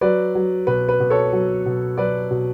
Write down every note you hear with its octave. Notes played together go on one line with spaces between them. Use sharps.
F#3 B4 D5
F#3
B2 B4
B4
B2
A4 C#5
F#3
B2
F#3 B4 D5
B2